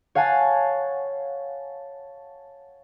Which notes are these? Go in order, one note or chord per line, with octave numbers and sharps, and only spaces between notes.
C#5 F5 F#5 G#5 A5